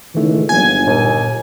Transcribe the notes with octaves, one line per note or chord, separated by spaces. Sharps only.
C#2 A2 D#3 E3 A3
G1 F#3 A#3 G#5
D#2 A#2